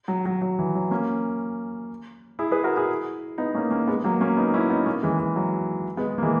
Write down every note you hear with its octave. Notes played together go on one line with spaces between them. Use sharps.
F#3
F#3
F#3
E3
F#3
A#3 C#4
E4 G#4
G#4 B4
F#4 A#4
E4 G#4
B3 D#4
A#3 C#4
A#3 C#4
G#3 B3
F#3 A#3
A#3 C#4
B3 D#4
C#4 E4
B3 D#4
A#3 C#4
E3 G#3
E3
F#3
G#3 B3
A#3
E3 G#3